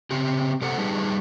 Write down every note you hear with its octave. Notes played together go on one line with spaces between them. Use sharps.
C#3 C4 G4
C3 G4 A4 C5 F#5 A#5
G3 D#4 G4 G#4 B4 A5